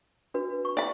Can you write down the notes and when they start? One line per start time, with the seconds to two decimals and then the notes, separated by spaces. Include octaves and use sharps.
0.34 D4 F#4 B4
0.65 C#6
0.77 D5 B5